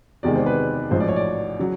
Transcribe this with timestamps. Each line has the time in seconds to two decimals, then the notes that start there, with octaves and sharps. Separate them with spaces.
0.23 E2 C3 D#3 G#3 D5
0.35 C5
0.46 B4
0.91 A1 G#2 F3 C5
1.00 D5
1.08 C#5
1.16 D5
1.59 C#3 F#3